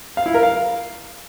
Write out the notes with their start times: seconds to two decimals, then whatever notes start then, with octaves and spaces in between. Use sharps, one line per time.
0.17 F5
0.26 E4
0.34 A#4
0.43 F5